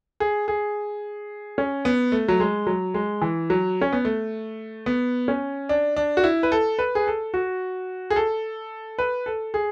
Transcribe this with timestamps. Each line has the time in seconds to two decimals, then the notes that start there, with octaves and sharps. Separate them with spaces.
0.20 G#4
0.48 G#4
1.58 C#4
1.85 B3
2.12 A3
2.28 F#3
2.40 G#3
2.67 F#3
2.94 G#3
3.22 E3
3.50 F#3
3.81 C#4
3.92 B3
4.05 A3
4.86 B3
5.28 C#4
5.69 D4
5.97 D4
6.17 F#4
6.24 E4
6.43 B4
6.52 A4
6.79 B4
6.95 G#4
7.07 A4
7.34 F#4
8.10 G#4
8.16 A4
8.98 B4
9.26 A4
9.54 G#4